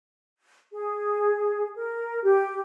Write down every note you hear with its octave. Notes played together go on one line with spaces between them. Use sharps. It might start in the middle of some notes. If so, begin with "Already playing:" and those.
G#4
A#4
G4